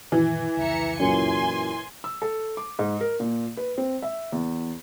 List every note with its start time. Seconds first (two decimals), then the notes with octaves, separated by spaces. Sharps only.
0.12 F#1 A#2 D#3 E3
0.57 F1 C#2 E5 A#5 C#7
0.99 F#2 A#2 G#5 C6
2.04 E6
2.22 A4
2.57 D6
2.79 G#2
3.01 A#4
3.20 A#2
3.57 B4
3.78 C4
4.02 E5
4.32 E2